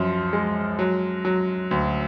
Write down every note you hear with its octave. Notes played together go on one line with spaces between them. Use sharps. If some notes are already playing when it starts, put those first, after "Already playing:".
Already playing: F#2 F3
G#3
F#3
F#3
D2